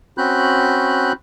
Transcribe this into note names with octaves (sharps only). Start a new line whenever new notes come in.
C4 C#4 F#4 B5 F#6 G6